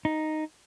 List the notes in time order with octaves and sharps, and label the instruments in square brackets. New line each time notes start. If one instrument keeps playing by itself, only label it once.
[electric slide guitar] D#4